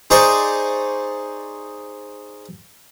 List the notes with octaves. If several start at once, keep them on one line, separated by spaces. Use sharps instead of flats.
D#4 G#4 C5 D5 A#5 C#6